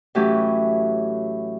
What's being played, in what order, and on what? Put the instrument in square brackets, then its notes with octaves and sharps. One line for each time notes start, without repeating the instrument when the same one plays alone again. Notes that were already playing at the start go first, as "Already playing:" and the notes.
[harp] A2 E3 F#3 A3 C#4 G4